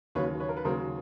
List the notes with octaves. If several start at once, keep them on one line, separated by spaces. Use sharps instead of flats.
D#2 C#3 F#3 B4 C#5
B4 C#5
A#4
B4
D#2 C#3 F#3 A#4 C5